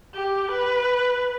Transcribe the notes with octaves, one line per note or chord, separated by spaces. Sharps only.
G4
B4